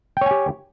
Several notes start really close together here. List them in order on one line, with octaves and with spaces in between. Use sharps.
G5 C#5 G#5 G4